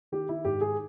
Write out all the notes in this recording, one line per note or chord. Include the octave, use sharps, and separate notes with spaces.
D#3 G4
E4
G#2 G4
G#4